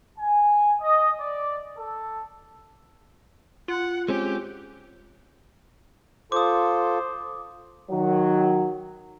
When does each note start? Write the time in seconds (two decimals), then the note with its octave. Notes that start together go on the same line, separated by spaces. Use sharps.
0.17 G#5
0.80 D#5
1.20 D5
1.77 A4
3.68 F4 F#5
4.09 G#3 C4 C#4 G4
6.32 F4 A4 C5 D6 D#6
7.91 D#3 F#3